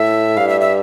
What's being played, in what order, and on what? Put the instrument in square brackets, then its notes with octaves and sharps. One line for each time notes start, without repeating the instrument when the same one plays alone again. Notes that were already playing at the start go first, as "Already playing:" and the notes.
Already playing: [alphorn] A2 [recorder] E5
[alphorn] G2 [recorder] F5
[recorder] E5
E5